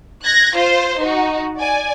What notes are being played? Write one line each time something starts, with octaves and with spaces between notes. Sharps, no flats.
F#6 G#6 A#6
F4 C5 C6
D#4 F#4
D5 G#5